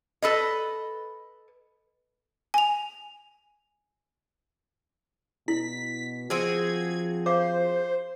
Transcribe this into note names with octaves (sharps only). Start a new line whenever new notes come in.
A4 B4 D#5
G#5 F7
B2 E4 B6
F3 C4 F#4 G#4 G#6
C5 F5 D6